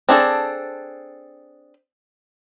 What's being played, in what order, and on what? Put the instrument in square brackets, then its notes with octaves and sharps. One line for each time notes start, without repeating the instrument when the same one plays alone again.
[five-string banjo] C4 D4 G#4 A4